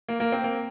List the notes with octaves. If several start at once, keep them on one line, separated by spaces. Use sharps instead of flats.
A#3
A#3
C4
A#3